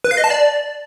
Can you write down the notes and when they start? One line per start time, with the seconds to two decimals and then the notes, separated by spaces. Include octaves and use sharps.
0.04 B4
0.11 F5
0.17 D#5
0.24 A5
0.30 D5